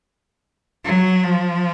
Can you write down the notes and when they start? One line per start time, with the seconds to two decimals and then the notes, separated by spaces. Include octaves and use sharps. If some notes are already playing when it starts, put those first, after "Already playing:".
0.85 F#3
1.23 F3